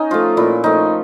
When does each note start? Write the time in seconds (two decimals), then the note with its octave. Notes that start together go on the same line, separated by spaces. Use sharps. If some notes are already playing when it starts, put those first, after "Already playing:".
Already playing: C#4 D#4
0.11 F3 A3 F4
0.37 A#2 E4
0.64 F3 A3 D#4